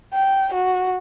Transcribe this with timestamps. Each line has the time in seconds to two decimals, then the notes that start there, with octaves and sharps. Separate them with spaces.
0.13 G5
0.54 F#4